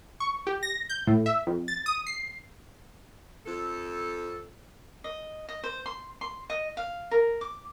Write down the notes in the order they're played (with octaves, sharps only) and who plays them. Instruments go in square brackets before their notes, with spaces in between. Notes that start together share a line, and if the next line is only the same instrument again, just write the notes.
[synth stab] C#6
G4
A#6
G6
A2
E5
F2
A6
D#6
C7
[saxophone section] F2 A4
[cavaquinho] D#5
D#5
C5
C6
C6
D#5
F5
A#4
D6